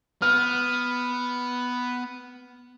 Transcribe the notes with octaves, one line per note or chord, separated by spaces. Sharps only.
B3 F6